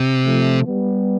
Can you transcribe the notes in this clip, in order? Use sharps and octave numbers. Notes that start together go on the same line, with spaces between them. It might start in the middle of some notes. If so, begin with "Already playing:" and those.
Already playing: C3
F3 A3
G3 B3